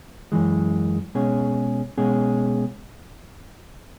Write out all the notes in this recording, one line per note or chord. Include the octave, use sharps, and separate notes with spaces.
F#2 E3 G#3
B2 G#3 C#4 G#4
B2 G#3 C#4 G#4